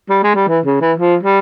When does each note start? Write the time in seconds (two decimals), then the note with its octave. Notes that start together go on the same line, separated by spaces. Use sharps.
0.10 G3
0.24 G#3
0.35 G3
0.48 E3
0.65 C#3
0.81 E3
0.98 F3
1.23 G3